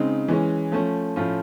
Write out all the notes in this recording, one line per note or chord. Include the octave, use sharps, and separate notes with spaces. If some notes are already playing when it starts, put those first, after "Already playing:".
Already playing: C#3 G#3 C4 D#4
E3 G#3 C#4
F3 A3 C#4
A2 F3 A3 C#4 F4